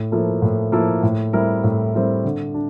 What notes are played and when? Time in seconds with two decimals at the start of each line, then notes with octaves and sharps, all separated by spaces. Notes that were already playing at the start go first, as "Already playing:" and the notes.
Already playing: A2
0.12 F3 A#3 E4 A4
0.42 A2
0.72 F3 A#3 E4 A4
1.03 A2
1.33 G3 C4 E4 A#4
1.64 A2
1.94 G3 C4 E4 A#4
2.25 D3
2.54 D4